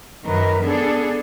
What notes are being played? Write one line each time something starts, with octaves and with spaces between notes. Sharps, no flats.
F#2 D#3 A#4 B4
B3 D4 G#4 A4